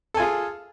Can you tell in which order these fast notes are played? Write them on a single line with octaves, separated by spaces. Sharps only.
A4 G#5 F4 G#4